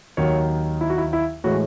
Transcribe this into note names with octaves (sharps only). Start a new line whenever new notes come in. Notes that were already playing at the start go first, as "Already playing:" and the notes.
D#2 D#3 F#3 C#5
E4
F#4
E4
E4
A2 E3 G#3 F#4